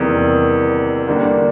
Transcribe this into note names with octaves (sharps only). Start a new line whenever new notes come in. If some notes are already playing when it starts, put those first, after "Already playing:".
Already playing: E2 C3 D#3 G3 A#3
D3 G3 A#3 D4